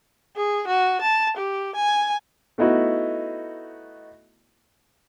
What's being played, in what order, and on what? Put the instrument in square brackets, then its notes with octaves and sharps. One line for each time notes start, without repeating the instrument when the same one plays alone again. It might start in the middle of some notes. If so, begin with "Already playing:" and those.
[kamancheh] G#4
F#4
A5
G4
G#5
[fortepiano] A3 B3 D#4 E4 F#4